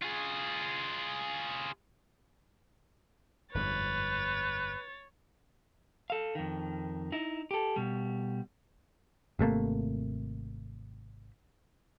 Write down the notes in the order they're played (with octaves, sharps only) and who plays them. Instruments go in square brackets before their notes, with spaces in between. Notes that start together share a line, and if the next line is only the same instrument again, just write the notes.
[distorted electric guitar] F4 G#4
[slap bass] G1 F2 G#2 [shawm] B4 [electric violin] C#5 A6
[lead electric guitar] A4 F5
F2 D#3
D#4 E4
G4 A4
B2 G3
[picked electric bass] G#1 C3 A3 A#3